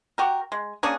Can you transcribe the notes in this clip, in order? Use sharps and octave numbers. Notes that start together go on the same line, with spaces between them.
F#4 G4 A#4
G#3
A#3 C#4 D4 G#4